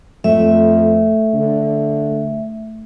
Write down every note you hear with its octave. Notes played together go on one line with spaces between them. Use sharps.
F2 A3 E5
D3